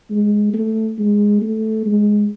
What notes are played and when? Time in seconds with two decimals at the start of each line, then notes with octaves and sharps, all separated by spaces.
0.10 G#3
0.53 A3
0.98 G#3
1.42 A3
1.86 G#3